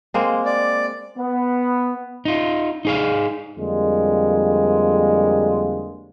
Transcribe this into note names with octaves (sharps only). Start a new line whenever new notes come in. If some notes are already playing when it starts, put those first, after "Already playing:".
G#3 A#3 C4
D5
B3
D#4 F4
D#4 G#4 F5
F2 D3 G3 G#3 A#3